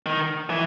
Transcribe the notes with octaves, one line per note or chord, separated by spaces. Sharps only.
D#3
E3